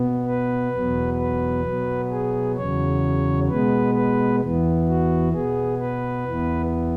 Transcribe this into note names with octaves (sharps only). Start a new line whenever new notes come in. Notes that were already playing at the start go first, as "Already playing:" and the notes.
Already playing: B2 B3
B4
E2 B2 F#3 B3
B4
B2 F#3 B3
G#4
E2 C#3 F#3 C#5
B2 G#3 B3 B4
B4
E2 E3 B3
F#4
B2 B3 G#4
B4
E2 E3 B3